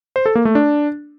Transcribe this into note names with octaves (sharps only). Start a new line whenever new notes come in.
C5
A4
A#3
A3
D4